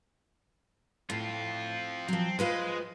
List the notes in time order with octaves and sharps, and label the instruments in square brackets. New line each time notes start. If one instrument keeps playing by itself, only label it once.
[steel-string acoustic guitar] A2 [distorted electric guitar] C4 F4
[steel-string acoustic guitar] F3 F#3 [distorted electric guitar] C4
[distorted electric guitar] G#3 [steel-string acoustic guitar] F4 B4 C5